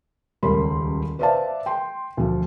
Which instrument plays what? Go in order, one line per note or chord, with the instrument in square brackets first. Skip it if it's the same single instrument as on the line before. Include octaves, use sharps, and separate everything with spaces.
[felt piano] D#1 C#2 G3 A#4 B5 C6
B4 C5 D5 E5 F5 A5
G5 C6
D2 F3